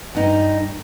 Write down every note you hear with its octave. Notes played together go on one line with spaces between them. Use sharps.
G2 D#4